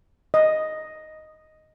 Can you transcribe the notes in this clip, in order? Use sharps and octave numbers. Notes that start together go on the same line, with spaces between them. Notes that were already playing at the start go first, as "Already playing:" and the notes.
D#5